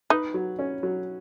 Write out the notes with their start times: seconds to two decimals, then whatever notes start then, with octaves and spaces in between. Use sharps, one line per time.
0.10 D#4 B4
0.34 F#3
0.59 C#4
0.83 F#3